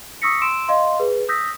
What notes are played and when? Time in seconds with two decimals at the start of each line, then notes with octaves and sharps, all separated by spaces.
0.22 C#6 D#6 E6 A#6 B6 C#7
0.41 C6 E6 D7 E7
0.68 D#5 F5 C6
1.00 G#4 B4
1.29 D#6 E6 G6 A#6 B6